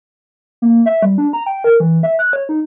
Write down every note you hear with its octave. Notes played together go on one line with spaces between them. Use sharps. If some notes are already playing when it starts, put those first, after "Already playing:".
A#3
E5
G3
D4
A#5
G5
A#4
E3
E5
F#6
C#5
D#4